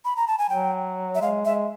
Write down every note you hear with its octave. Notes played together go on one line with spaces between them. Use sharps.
B5
A#5
A5
G#5
F#3 G5
E5
G#3 F5
G#3 E5